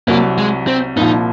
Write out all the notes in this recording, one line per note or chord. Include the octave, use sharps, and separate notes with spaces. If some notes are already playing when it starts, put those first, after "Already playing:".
C2 C3 F#3 A#3
G#3
C4
C2 A#2 F3 D#4